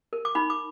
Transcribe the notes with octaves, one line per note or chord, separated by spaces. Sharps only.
A#4
D6
D#4 B5
D6